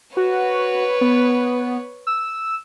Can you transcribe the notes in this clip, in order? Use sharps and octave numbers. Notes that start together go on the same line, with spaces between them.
F#4 B4 C#5
B3
E6